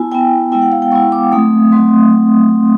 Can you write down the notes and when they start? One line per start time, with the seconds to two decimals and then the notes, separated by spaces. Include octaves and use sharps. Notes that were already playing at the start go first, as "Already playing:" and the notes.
Already playing: B3 E4 G#5 A5
0.12 B3 E4 G5
0.52 G#3 B3 E4 G5
0.62 F#5
0.72 F5
0.82 G5
0.92 G#3 B3 E4 C#6
1.12 D6
1.32 F#3 A3 C4 D#6
1.72 F#3 A3 C4 C6